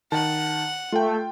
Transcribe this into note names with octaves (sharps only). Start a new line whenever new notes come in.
D#3 F#5 A5
A3 F4 G5